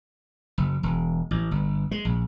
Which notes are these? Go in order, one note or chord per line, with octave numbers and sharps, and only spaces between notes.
F#1
E1
A1
G1
G#3
A#1